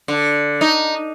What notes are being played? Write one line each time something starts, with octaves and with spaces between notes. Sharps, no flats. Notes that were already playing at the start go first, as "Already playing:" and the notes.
D3
D#4